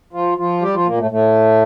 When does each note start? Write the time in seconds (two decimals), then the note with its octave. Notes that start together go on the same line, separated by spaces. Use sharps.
0.13 F3 F4
0.38 F3 F4
0.62 G3 G4
0.74 F3 F4
0.86 A#2 A#3
0.99 A2 A3
1.11 A2 A3